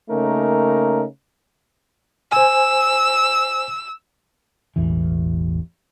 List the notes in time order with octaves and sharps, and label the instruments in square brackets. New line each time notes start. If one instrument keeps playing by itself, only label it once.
[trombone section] C#3 A3 A#3 C#4 D#4 A#4
[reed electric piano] C5 G#5 [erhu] E6
[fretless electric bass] E1 A1 E2 E3